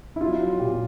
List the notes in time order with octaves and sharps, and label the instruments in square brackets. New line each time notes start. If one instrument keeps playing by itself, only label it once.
[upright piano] E4
F#3 F4
F#3
A#2 G4